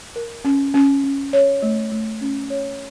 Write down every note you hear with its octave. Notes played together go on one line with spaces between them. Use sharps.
A#4
C#4
C#4
C#4
C#5
A3
A3
C#4
C#5